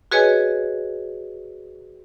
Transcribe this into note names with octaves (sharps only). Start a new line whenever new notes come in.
F#4 G#4 B4 C#5 D#5 G#5